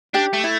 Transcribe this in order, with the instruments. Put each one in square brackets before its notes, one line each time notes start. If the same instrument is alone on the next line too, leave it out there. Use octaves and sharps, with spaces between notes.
[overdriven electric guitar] D4 [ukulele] G4
[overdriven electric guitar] A3
[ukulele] E4